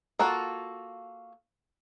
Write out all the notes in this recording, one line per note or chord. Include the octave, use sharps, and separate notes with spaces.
A#3 F4 F#4 A4